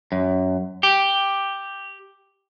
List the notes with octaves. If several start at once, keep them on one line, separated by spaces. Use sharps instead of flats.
F#2
G4